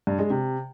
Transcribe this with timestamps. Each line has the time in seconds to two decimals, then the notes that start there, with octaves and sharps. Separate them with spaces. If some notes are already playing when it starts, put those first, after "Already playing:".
0.07 G2
0.19 G#3
0.30 C3